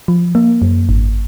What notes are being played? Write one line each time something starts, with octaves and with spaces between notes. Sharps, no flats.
F3
A#3
F#2
G#1